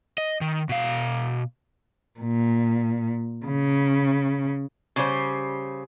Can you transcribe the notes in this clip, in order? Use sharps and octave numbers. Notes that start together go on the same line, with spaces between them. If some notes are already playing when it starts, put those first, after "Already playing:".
D#5
D#3
B2 F5
A#2
C#3
C#3 G3 C5